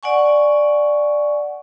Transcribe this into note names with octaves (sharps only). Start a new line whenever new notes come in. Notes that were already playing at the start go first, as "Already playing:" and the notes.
D5 F#5 G#5 C#6